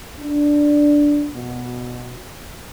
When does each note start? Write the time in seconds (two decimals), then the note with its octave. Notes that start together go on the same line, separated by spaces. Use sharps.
0.19 D4
1.34 B2